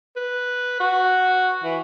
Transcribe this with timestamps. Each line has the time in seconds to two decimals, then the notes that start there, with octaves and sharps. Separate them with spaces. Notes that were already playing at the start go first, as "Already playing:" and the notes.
0.16 B4
0.80 F#4
1.63 E3